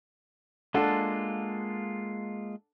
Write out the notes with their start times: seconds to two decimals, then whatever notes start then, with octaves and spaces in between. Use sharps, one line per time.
0.74 G#3 A#3 D4 F4 A4 F#5